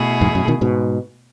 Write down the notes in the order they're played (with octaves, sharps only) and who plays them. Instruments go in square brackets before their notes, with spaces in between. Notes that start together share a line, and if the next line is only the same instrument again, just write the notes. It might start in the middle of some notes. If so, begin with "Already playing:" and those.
Already playing: [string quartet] B2 A3 E4 G#4
[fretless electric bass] E2 G#2
F#2
B2 D#3
G#2 B2